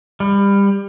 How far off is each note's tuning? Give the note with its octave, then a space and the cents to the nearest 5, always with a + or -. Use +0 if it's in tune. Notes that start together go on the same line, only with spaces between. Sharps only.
G3 +25